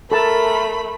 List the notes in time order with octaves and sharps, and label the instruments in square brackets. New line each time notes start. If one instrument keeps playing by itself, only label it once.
[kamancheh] A3 [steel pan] A4 A5 [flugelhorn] A#4 [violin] B5